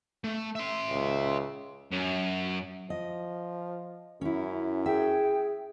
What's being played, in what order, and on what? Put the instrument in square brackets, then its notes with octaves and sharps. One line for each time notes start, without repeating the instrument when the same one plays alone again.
[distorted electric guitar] A3
E5 C6
[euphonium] C#2
[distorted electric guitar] F#2
[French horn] F3 [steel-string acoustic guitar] D#5
[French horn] F#2 [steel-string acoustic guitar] C#4 E4
[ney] G#4 [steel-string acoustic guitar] E5 [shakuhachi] G5